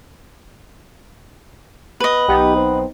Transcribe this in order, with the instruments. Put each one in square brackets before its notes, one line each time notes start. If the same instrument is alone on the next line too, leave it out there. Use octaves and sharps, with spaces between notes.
[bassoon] B3 [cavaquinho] B4 D#5
[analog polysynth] B1 B3 D#4 [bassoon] G4
[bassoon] C4